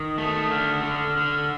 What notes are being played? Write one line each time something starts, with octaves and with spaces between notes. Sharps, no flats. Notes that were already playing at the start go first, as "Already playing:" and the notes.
Already playing: D#3 D#6
A3
D3 F6
D#6
D3
F6
D3